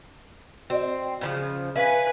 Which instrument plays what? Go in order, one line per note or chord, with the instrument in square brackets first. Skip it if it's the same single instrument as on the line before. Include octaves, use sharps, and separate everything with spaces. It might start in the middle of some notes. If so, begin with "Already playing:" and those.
[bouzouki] C4 [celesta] F#4 D5 D#5
[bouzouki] C#3 E3 F3
[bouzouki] C#4 [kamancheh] B4 G#5 [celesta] E5 F5 B6